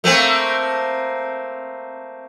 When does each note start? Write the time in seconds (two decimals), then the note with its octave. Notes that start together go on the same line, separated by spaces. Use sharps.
0.04 A3 A#3 C4